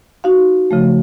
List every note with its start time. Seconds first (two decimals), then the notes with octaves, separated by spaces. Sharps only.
0.24 D#4 F#4 F5
0.71 C#3 F3 A3